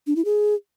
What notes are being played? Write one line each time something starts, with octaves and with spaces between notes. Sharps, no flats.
D4
E4
G#4